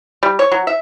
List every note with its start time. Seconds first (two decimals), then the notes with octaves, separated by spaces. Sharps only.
0.23 G3
0.39 C#5
0.52 F#3
0.67 E5